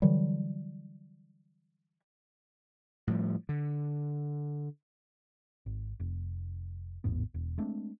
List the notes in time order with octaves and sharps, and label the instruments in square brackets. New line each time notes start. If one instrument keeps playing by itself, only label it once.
[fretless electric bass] D3 E3 F#3 G3
[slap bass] A2 F3 G3
D3
[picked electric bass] G#1
F1
A1 E2 G#2 B3
E1
G#3 A3 C4 D4